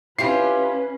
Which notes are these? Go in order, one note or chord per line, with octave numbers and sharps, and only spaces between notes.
C#4 E4 F4 G4 B4 C7